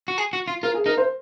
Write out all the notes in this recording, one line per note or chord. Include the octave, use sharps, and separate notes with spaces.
F#4
G#4
F#4
F4
F4 A#4
G#4
D#4 A#4
C5